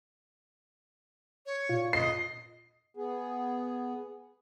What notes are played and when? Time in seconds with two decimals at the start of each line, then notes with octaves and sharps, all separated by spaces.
1.46 C#5
1.69 A#2 F4
1.93 D#5 C7
2.97 B3 G#4